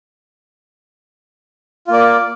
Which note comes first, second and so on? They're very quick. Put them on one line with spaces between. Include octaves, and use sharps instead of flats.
F4 A#3 D5